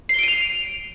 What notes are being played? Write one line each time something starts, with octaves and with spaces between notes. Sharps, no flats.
C7 D7 D#7 F7 G7